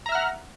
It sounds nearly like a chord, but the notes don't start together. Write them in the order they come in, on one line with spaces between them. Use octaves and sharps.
A#5 E5 F6 F#5